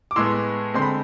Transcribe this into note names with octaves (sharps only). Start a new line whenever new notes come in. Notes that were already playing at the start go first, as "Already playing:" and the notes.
D6
A2 G#3 B3 C6 E6
D3 G#3 C4 C6
B5